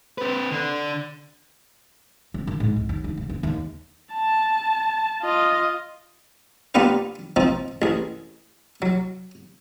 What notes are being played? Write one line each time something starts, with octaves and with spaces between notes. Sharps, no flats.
C4 B4
D3
C4
D#3
G#2
C2
D#2
D#3
C3
B3
D#2
A5
F4 D#5
A#3 B3 D4 F4 G4 B4
F3 C4 D#4
A1 G#4
F#3